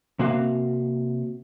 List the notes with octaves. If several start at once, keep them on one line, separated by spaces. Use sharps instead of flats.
C3 A#3 F#4 F5